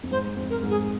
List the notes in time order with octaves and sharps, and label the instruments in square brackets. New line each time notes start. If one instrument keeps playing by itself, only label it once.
[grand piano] F2
[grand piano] G#2 [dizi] C5
[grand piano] F2
[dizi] A#4
[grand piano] G#2
[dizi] G#4